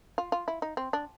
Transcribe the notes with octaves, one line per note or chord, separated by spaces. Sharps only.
F4
F4
E4
D#4
C4
D4